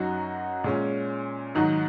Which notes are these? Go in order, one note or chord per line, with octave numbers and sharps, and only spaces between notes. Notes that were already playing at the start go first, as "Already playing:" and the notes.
Already playing: F#2 F#3 D#4 F#4
A#2 G#3 C#4
G#2 D#3 F#3 D#4 F#4